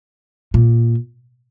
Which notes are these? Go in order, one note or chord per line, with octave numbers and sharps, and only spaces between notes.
A#2